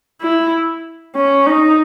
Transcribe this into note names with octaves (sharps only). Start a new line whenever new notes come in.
E4
C#4
D#4